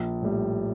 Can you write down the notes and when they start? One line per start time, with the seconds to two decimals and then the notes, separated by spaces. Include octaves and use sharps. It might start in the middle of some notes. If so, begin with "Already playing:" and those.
Already playing: A#1
0.22 A2 G3